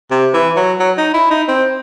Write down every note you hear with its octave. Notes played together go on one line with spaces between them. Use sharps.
C3
E3
F#3
F#3
D#4
E4
D#4
C4